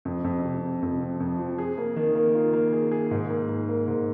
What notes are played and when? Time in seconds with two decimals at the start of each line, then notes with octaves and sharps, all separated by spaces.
0.05 F2
0.24 F2
0.44 C3
0.63 C3
0.82 F2
1.01 F3
1.20 F2
1.39 F3
1.58 G#4
1.78 A#3
1.96 D#3
2.15 A#3
2.35 F4
2.53 A#3
2.73 G#4
2.92 G#4
3.11 G#2
3.30 A#3
3.49 A#3
3.69 A#3
3.88 G#2